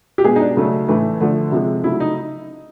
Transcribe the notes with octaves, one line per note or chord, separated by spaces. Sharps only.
G4
B2 G#3 G#4
D#4
D4
C#3 F#3 A3
A2 E3 A3
D3 F3 A3
C3 F3 G#3
C#3 F#3 A3 E4
D#4